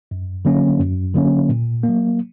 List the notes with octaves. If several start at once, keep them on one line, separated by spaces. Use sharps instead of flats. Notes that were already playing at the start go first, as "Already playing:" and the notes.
F#2
D3 F#3 A#3 C#4
F#2
D3 F#3 A#3 C#4
A#2
F#3 A#3